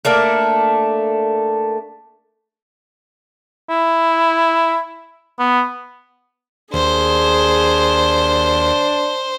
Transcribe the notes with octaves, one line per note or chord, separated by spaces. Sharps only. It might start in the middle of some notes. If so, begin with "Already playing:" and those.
A3 A#3 D4 A#4
E4
B3
D#2 D4 G#4 C5